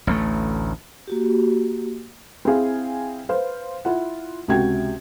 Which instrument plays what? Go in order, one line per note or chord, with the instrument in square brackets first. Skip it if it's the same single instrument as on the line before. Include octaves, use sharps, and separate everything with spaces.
[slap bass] A1 D2 G#3 A3
[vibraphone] A#3 F#4 G4
[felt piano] C4 E4 G#4 F5
B4 C5 F5
E4 F4 F#5
C#2 C3 F#4 G5 G#6